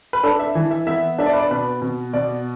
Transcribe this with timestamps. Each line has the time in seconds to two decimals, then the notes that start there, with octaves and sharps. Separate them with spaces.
0.13 B4
0.23 D4 A4
0.39 E5
0.55 E3
0.71 E5
0.87 B3 E5
1.18 D4 E5
1.26 D5
1.33 B4
1.39 D5
1.51 B2 B4
1.82 B2
2.13 B2 D5